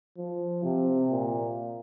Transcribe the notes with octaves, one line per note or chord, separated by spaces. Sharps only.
F3
C3
A#2